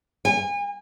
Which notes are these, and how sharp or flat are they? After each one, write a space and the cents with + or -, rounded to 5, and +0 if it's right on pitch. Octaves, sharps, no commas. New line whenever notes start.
G#5 -35